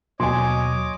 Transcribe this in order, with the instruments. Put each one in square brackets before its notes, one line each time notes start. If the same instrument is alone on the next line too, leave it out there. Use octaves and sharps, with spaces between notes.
[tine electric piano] D#2 B2 [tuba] F#3 [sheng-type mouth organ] C#5 D#5 D6 [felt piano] G#5 C6